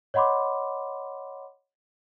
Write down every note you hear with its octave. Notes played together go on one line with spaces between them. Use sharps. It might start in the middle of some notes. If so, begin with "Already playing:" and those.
C#5 D#5 F#5 B5 C6 D6